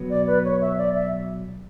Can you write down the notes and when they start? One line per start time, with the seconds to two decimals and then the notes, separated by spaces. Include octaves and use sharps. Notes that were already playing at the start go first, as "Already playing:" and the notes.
Already playing: B2 F#3 B3
0.10 D5
0.27 B4
0.44 C#5
0.61 E5
0.78 D5
0.95 E5